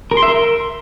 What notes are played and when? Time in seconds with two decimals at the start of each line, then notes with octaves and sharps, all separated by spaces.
0.11 A#4
0.17 C6
0.23 E5
0.28 A#4